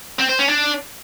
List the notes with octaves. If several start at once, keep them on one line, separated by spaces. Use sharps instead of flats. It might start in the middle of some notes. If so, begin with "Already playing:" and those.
C4
C5
C#4
D4